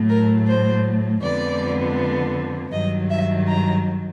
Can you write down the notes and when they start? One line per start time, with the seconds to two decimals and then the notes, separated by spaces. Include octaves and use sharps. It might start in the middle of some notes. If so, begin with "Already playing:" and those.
Already playing: A2 F#3 A3
0.08 A#4
0.46 C5
1.21 F2 D3 F3 G#3 B3 D5
2.72 G2 D#3 F#3 D#5
3.10 E5
3.47 A#5